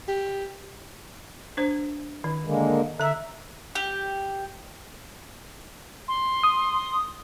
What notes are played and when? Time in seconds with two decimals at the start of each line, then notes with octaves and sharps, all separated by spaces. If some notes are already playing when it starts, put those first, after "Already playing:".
0.08 G4
1.57 D4 C5
2.24 D#3
2.45 D3 G#3 A#3
3.00 D3 E5 A#5
3.75 G4
6.08 C6
6.43 D#6